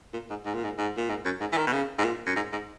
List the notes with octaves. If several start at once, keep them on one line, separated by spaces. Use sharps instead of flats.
A#2
G#2
G#2
A#2
G#2
G#2
A#2
G#2
F#2
G#2
E3
D#3
B2
C#3
G#2
A#2
F#2
G#2
G#2